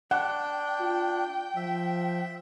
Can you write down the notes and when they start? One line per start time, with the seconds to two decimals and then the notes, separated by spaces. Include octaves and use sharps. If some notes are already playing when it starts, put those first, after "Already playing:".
0.11 D4 F#5 G5
0.81 F4
1.56 F3 E5